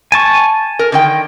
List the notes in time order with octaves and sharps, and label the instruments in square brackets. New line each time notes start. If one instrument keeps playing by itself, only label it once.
[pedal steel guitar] G#5 A5 C#6
[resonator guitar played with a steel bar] A#4
D3 D#3 G5